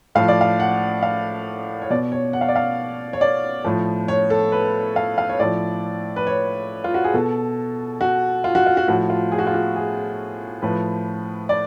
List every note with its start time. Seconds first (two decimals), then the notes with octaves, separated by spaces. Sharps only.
0.15 A2 F3 F5
0.28 D5
0.41 F5
0.60 F#5
1.03 F5
1.82 C#5
1.90 B2 D5
2.12 C#5
2.33 F#5
2.41 F5
2.48 D5
2.56 F5
3.13 C#5
3.21 D5
3.64 A2 F3
4.08 C#5
4.30 A4
4.52 B4
4.96 F5
5.18 F5
5.29 C#5
5.39 A2 F3 D5
6.16 B4
6.27 C#5
6.84 F4
6.94 F#4
7.04 G#4
7.14 B2 A4
8.01 F#4
8.44 F4
8.55 F#4
8.66 F4
8.77 F#4
8.88 A2 F3 F#4
9.10 F4
9.32 G#4
9.39 F#4
9.47 F4
9.54 F#4
9.76 G#4
10.62 A2 F3 B4
11.49 D5